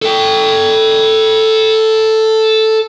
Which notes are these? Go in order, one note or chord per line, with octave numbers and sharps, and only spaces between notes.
A4 G5